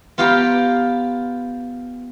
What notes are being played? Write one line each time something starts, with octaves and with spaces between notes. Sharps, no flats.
B3 F4 G4 F5 G5 A#5